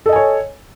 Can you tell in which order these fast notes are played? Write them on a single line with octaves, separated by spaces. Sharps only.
A4 D#5 G#5 C#5